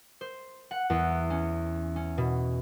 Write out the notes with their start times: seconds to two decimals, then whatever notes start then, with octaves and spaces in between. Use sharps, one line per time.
0.21 C5
0.71 F#5
0.90 E2
1.30 C#4
1.96 C#4
2.18 B2